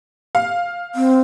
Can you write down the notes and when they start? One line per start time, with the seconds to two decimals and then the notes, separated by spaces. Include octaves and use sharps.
0.35 F5
0.95 C4